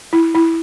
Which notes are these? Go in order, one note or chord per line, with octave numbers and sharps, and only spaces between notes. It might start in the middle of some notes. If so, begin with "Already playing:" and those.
E4
E4